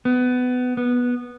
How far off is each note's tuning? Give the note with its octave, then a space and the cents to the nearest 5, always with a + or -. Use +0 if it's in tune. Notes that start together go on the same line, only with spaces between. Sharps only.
B3 +20
B3 -10